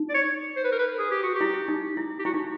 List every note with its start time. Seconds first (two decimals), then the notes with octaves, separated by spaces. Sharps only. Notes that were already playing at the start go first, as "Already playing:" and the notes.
Already playing: D#4
0.09 D5
0.14 C#5
0.56 C5
0.64 B4
0.72 A#4
0.79 B4
0.98 G#4
1.11 G4
1.23 F#4
1.35 G4
1.41 E4
1.68 D#4
1.97 E4
2.19 G4
2.25 E4 F#4
2.34 D#4